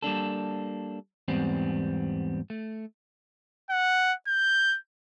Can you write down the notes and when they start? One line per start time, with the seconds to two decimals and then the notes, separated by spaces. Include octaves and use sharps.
0.03 G3 A#3 D4 A4
1.28 E2 G#2 G3 B3 C4
2.50 A3
3.70 F#5
4.27 G6